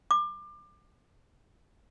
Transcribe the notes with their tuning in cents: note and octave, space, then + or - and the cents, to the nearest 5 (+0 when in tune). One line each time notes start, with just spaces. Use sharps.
D6 +30